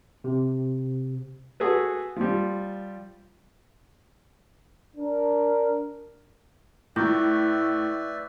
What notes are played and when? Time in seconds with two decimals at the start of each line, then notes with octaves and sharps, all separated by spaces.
0.24 C3
1.60 F#4 G#4 A4 B4
2.16 F3 G3
4.97 D4 A#4
6.96 A2 E4 B4 D5 E5 C#6 D6 G6